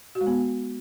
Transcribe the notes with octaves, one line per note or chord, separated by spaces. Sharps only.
F#4
G#3
B3